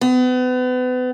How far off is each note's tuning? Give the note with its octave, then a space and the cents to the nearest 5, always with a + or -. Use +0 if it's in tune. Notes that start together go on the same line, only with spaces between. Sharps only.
B3 +35